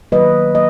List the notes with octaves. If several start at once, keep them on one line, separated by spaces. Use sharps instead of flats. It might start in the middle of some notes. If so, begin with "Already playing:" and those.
D#3 F#3 A#3 B4 D#5
A#3 D#5